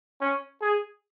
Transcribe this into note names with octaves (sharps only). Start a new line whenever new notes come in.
C#4
G#4